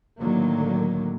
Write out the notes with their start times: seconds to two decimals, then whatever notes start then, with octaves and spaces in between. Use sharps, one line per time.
0.18 A2 D3 D#3 F#3 A#3